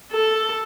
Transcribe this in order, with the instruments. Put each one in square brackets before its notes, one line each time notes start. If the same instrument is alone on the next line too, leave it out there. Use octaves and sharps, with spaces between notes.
[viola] A4